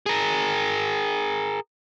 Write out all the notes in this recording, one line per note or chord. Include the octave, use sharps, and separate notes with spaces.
G#4 A#4